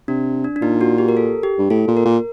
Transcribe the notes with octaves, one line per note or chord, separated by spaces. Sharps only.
C3 D4
D4
D4
A#2 D#4
F#4
G4
A#4
A4
G4
G2
A2 A4
A#2
A#4
A#2